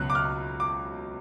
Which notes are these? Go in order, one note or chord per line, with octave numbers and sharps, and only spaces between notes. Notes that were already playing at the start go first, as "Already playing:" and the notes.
Already playing: C#2 B2 F#3 C#4 F#6
D6
F6
D6